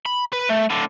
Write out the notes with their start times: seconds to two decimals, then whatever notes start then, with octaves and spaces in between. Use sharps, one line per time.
0.06 B5
0.33 B4
0.49 A3
0.70 A2 D3